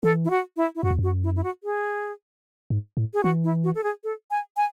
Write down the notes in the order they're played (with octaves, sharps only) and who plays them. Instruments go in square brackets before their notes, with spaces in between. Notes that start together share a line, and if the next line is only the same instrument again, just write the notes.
[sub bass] E3 [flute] A4
[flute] E4
F#4
E4
E4
[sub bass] F#2 [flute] F#4
[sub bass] E2
[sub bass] F#2 [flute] F#4
[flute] E4
E4
F#4
G#4
[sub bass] G#2
A2
[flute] G#4
[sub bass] E3 [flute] F#4
[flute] E4
F#4
A4
G#4
A4
G#5
G#5